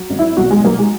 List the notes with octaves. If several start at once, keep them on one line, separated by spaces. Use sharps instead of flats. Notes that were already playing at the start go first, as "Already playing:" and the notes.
Already playing: F#3
G#1
E4
B1 F#4
G#3
F#3 A#3
G#3